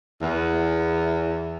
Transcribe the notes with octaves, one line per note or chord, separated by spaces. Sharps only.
E2